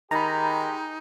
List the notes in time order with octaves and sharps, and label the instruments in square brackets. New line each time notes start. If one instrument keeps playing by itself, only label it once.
[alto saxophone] D#3 [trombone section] G#3 G4 G#4 [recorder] D#4 [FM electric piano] A#5 B5